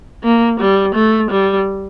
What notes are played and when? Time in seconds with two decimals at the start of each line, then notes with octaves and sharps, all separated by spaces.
0.24 A#3
0.60 G3
0.95 A3
1.31 G3